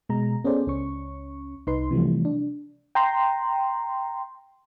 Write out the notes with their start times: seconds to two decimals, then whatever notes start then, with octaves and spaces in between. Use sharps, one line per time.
0.09 B2 G#3 A#5
0.44 B3 C#4 G#4 A4 C5 D5
0.67 C#2 C#4 C#6
1.67 C2 D#4 B4 C6
1.91 C3 E3 F3 G3 A3
2.25 D4
2.95 G5 A#5 C6